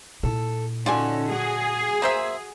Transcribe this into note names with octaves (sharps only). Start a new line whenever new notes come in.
A#2 E4 A4
D3 C#4 D#4 F4 F#4 A4 D5 G#5
F#4 G#4
A#3 C5 E5